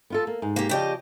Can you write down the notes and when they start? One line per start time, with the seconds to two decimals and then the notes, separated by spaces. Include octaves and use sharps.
0.10 B3 F4 A4
0.27 A#3
0.42 G#2
0.56 A#3 G4
0.69 C#3 F3 G4 D5 D#5 G5